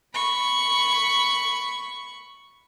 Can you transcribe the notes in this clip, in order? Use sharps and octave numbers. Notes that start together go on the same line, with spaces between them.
B5 C#6